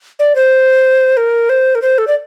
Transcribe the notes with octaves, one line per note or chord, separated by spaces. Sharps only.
D5
C5
A#4
C5
A#4
C5
A4
D5